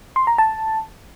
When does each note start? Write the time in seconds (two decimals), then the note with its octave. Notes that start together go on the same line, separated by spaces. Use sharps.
0.16 C6
0.27 A#5
0.38 A5